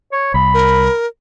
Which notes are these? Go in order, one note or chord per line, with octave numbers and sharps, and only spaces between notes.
C#5
C2 B5
A#4